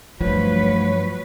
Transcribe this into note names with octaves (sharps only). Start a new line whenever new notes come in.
G2 F3 F#3 A3 B4 C#5